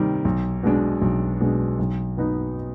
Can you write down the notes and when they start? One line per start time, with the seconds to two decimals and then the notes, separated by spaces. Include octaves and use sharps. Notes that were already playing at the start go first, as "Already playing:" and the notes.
Already playing: C3 D#3 G3
0.25 B1
0.63 B2 G#3 D4
1.01 B1
1.40 B2 G#3 D4
1.79 B1
2.17 B2 B3 D#4